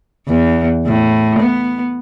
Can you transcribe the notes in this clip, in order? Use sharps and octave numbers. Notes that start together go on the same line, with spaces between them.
E2
A2
B3